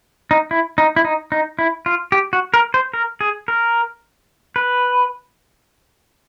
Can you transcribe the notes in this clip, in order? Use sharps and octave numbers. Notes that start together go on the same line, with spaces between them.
D#4
E4
D#4
E4
D#4
D#4
E4
F4
G4
F#4
A#4
C5
A#4
G#4
A#4
B4